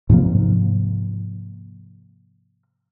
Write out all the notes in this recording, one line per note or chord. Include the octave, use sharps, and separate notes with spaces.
G#2 C3 F3 A#3